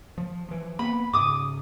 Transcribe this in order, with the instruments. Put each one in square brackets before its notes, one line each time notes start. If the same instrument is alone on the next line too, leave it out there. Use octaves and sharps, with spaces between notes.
[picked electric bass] F3
E3 F3
[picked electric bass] A#3 B3 [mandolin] B5
[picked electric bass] G#2 C#3 [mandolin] D6 D#6